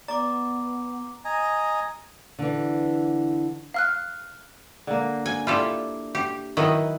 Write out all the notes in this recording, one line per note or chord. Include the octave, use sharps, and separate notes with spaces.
B3 D5 A#5 D6
D#5 G#5 A#5
D3 E3
F5 F6 F#6
D3 A#3
G#5
D4 E4 F4 G4 A4
G4
D#3 F#3 D#4 E4 B4 D#5